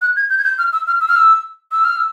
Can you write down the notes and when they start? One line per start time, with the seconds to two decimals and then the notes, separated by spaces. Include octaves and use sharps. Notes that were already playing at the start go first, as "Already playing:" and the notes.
0.02 F#6
0.16 G#6
0.30 G6
0.38 G#6
0.44 G6
0.58 F6
0.73 E6
0.87 F6
1.01 E6
1.08 F6
1.16 E6
1.72 E6
1.85 F6
1.97 E6